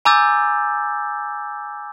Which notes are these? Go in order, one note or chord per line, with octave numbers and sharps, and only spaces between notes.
G#5 A#5 D6 E6 G6 A6